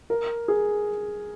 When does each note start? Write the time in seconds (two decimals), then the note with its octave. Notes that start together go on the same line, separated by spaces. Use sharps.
0.10 A#4
0.48 G#4